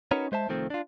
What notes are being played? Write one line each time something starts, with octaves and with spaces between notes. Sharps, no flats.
C#4 D#4 F#4 A#4 B4 C#5
G#3 C5 E5 A5
C2 D#3 F3 A3 C4
D4 F4